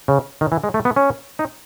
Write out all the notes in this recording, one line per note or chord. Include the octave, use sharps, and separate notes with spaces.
C#3
D#3
E3
G#3
A3
B3
C#4
D#4